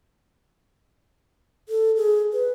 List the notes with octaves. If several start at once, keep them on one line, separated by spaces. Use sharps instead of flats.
A4
G#4
B4